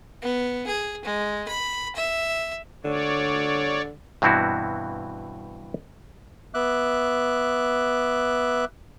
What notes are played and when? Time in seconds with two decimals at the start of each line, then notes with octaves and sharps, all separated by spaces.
0.22 B3
0.66 G#4
1.05 G#3
1.48 B5
1.95 E5
2.84 D3 C#5 D5
4.22 G2 B2 E3 C4 E4 F#4
6.54 B3 E5 D6 F#6